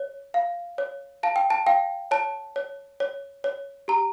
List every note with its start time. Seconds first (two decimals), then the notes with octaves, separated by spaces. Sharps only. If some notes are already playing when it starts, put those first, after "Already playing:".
Already playing: C#5
0.34 F5
0.78 C#5
1.23 F5 A5
1.36 G5
1.50 A5
1.67 F5 G5
2.11 C#5 A5
2.56 C#5
3.00 C#5
3.44 C#5
3.88 G4 A#5